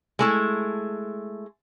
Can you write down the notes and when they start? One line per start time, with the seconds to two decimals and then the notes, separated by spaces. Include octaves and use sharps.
0.19 G#3 A3 E4